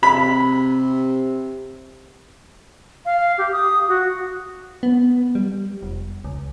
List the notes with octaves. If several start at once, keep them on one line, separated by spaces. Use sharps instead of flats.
C3 B5
F5
G4
D#6
F#4
B3
G3
F1
C#2